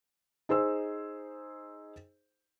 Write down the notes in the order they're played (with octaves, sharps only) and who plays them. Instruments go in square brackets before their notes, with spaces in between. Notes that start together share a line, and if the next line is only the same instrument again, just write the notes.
[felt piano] D#4 G#4 C5 E6